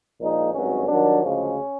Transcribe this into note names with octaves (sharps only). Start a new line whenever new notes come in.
A#1 A#2 F3 G#3 D#4
G#1 G2 D#3 F#3 C#4
G2 D#3 F#3 D4
D2 C#3 F3 G#3 C#4